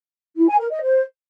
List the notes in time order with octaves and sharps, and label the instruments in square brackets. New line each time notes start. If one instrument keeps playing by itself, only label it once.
[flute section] E4
G#5
A#4
D#5
C5